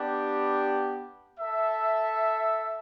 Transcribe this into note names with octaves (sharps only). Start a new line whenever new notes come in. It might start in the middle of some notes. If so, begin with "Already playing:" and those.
Already playing: B3 D4 G4
A4 E5